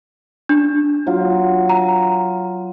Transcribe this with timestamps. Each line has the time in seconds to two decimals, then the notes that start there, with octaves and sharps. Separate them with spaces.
0.49 D4
1.07 F#3 F4
1.69 A#5